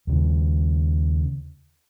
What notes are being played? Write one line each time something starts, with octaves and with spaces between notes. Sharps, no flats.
D#2 C#3